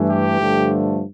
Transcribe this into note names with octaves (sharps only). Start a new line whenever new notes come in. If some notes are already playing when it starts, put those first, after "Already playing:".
Already playing: G2 E3 A3
G4
G2 D3 F3 A3